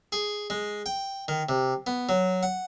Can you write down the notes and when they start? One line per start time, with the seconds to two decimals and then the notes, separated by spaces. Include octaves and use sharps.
0.12 G#4
0.50 G#3
0.86 G5
1.28 D#3
1.49 C3
1.87 B3
2.09 F#3
2.43 F#5